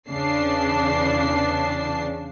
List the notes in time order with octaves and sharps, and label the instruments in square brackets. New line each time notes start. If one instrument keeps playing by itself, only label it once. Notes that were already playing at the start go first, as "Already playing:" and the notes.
[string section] E2 C#3 D4 A5 C7